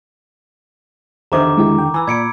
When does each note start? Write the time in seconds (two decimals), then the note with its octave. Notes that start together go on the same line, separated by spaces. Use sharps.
1.32 E2 D3 D#3 G4 C5 E5 A#5 D6
1.57 G#3 E4 G4
1.78 G5
1.94 E3 G#5 B5 E6
2.08 A#2 D5 B5 G#6 C#7 D7